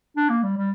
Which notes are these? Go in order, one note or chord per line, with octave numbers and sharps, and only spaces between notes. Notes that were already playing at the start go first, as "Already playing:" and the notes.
D4
A#3
G3
G3